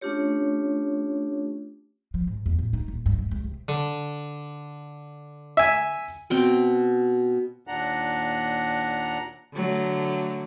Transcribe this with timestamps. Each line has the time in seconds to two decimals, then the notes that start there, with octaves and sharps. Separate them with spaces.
0.01 A3 C#4 D4 F4 G4 C#5
2.14 F3
2.27 G#2
2.46 E2
2.59 A2
2.73 D#4
2.88 D#1
3.06 G2
3.19 A3
3.31 C#2
3.44 C3
3.68 D3
5.57 E5 G#5
6.30 B2 C4 G5
7.67 D#2 A#2 D4 F#5 A#5
9.53 D3 F#3 A3